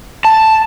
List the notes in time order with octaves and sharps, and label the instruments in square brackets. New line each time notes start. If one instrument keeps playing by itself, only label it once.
[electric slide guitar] A5